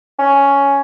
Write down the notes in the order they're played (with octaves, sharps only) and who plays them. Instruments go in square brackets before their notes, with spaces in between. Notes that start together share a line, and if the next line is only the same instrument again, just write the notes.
[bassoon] C#4